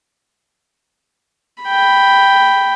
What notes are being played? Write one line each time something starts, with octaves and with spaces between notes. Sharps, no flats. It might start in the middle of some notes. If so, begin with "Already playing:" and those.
G5 B5